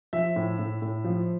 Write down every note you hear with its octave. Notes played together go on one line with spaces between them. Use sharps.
F3 E5
A2
A2
A2
F3